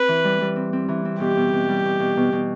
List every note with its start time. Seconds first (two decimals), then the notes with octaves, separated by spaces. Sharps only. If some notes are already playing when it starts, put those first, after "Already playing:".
Already playing: C4 B4
0.08 E3
0.24 G3
0.41 G3
0.56 C4
0.73 C4
0.89 E3
1.05 C4
1.20 B2 G4
1.37 B2
1.53 B2
1.69 G3
1.84 B2
2.00 B2
2.17 B2
2.32 B2